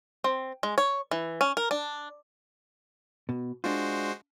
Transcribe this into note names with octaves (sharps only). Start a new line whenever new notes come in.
C4
G#3
C#5
E3
C#4
A#4
D4
B2
G#3 D4 F4 F#4 C5